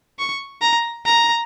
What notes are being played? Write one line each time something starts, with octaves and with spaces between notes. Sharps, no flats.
C#6
A#5
A#5